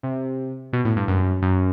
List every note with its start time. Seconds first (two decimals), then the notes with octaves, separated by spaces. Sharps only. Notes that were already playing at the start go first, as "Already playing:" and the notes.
0.03 C3
0.73 B2
0.85 A2
0.96 G2
1.08 F#2
1.42 F#2